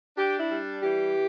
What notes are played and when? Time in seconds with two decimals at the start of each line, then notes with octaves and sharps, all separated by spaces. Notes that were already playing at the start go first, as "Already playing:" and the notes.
0.17 D4 G4
0.39 E4
0.50 G3
0.82 E3 G4